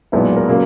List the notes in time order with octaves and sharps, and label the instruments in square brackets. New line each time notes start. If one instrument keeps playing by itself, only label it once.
[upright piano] B1 A#2 G#3 B3 E4
A#4
C#3 F#3 A#3